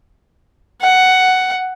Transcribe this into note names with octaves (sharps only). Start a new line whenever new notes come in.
F#5